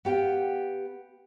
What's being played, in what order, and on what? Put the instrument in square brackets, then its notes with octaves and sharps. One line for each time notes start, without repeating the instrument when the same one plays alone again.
[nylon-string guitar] B3 G4 F5 G5